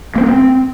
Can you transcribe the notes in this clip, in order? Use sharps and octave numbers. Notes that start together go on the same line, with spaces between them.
A#3
C4
A#3
C4